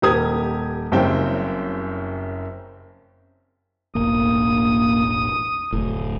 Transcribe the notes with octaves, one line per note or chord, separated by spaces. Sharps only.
D#1 G4 A#4 D#6 G#6
F#1 F#2 C#3 G3 C4 G5
E1 A1 A#3 D#6
F1 D2 A2